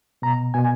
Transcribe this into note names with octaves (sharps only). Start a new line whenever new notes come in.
B2 A#5
B2 G#5